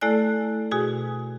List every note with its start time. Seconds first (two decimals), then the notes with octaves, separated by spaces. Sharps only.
0.01 A3 E4 A4 D5 G#5 F#6
0.71 B2 F#4 G#4 G#5